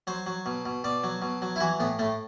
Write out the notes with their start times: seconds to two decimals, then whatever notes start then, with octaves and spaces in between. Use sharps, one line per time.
0.07 F#3 C5
0.26 F#3
0.46 B2
0.66 B2
0.84 B2 D5
1.04 F#3
1.22 B2
1.42 F#3
1.56 E4
1.61 E3 F#4
1.80 A2 B3
1.99 A2 A3